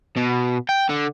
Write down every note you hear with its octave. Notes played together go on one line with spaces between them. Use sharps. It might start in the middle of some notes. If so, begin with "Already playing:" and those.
B2
G5
D3